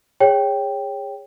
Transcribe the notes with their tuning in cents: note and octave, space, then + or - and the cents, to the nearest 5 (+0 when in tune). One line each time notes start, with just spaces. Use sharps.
G#4 -25 C#5 +0 G5 +0